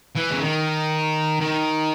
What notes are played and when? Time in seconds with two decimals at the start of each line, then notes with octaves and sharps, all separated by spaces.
0.16 E3
0.30 C#3
0.40 D#3
1.41 D#3